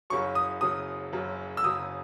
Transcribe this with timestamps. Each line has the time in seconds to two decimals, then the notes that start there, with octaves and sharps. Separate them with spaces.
0.10 F#1 F#2 C#3 F#3 C#6
0.35 D#6
0.61 F#1 F#2 C#3 F#3 D#6
1.13 F#1 F#2 C#3 F#3
1.57 E6
1.64 F#1 F#2 C#3 F#3 D#6